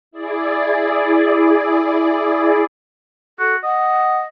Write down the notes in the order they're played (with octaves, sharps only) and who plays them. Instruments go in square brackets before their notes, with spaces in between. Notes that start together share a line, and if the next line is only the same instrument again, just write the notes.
[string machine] E4 G#4 D5
[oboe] F#4 [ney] A4
[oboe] D#5 [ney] F#5